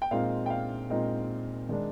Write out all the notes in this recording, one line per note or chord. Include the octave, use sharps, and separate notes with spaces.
G5
A#2 G#3 C4 D#4 F5
G5
F5
A#2 G#3 C4 D#4
D#3 G#3 D4